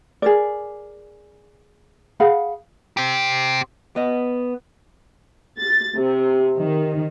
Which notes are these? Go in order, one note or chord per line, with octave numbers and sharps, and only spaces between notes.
G#4 A#4 D5
G#4 F5 F#5 B5
C4 G4
B3 D#5
A6
C3
D#3